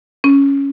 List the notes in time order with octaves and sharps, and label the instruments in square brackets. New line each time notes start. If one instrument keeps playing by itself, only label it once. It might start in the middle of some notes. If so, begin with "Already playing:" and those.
[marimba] C#4